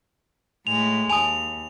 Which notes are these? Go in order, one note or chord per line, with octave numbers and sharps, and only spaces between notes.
A2 G#3 F7
D#2 G#5 A5 D#6 F7